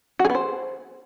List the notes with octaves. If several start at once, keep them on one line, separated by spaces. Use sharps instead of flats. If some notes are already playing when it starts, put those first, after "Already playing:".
F#4
G#4
B3
C5